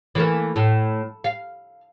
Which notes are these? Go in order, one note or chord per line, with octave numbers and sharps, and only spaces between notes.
E3 A3 A#3
A2
F5